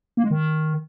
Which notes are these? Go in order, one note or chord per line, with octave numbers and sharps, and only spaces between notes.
A#3
G#3
D#3